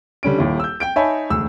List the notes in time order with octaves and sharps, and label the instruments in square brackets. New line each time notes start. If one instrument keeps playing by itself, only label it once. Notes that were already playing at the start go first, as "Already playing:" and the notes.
[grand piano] D3 G3 C#4 D7
D#1 D#2 E4
E6 G6
G5 G6 D7
D#4 C#5 E5 G#5 A5 B5
E1 D2 E6